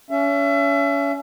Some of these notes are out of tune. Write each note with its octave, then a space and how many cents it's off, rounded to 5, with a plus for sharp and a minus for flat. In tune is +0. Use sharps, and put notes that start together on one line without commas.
C#4 +30 E5 +30